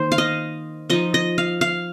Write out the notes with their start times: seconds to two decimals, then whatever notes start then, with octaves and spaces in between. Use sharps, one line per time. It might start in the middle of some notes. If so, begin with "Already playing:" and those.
Already playing: D#3 A#3 D#4 C5
0.12 F5
0.18 D#5
0.90 F3 D#4 D#5
1.14 D#5
1.38 F5
1.61 F5